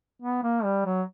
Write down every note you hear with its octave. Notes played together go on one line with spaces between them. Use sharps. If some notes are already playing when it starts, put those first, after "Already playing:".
B3
A#3
G3
F#3